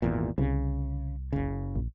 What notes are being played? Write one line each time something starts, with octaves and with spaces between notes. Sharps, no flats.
G#1 E2 A#2
C2 C#3
F#1 C#3
A#1